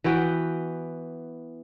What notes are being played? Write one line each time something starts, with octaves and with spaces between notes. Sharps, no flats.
E3 B3 F#4 G5